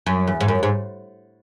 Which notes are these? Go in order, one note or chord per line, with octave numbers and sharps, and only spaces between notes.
F#2
E2
G#2
F#2
G#2